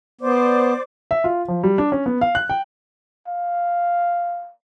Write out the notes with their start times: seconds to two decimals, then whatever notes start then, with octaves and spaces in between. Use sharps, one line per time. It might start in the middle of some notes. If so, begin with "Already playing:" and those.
0.21 B3 C5 D5 D6
1.11 E5
1.24 F4
1.48 F3
1.64 G3
1.78 D4
1.92 C#4
2.06 B3
2.21 F5
2.35 F#6
2.50 G5
3.28 F5